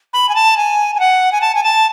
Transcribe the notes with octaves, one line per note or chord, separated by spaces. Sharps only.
B5
G#5
A5
G#5
G#5
F#5
G#5
A5
G#5
A5